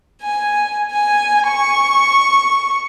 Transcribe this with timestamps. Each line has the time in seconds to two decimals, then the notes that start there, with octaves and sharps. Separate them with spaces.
0.23 G#5
0.92 G#5
1.49 C#6